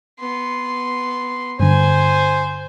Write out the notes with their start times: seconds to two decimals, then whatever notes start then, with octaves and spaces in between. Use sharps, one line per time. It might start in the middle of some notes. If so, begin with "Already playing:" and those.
0.19 B3 C6
1.60 G2 D3 C5 G#5